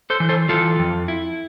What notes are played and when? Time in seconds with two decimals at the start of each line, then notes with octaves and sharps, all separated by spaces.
0.10 A4 C5
0.20 E3
0.29 A4 C5
0.49 E3 F4 A4
0.79 F2
1.08 E4